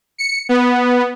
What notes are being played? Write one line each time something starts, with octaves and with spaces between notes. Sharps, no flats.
C#7
B3